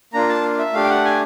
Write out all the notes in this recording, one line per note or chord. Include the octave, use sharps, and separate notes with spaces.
A#3 D4 F4 A#5
A5
E5
A3 D4 G4 F5
G5
F#5
G#5